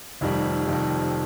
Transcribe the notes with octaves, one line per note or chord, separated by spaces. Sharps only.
F1 F2 D#3 G3
F1 F2 D#3 G3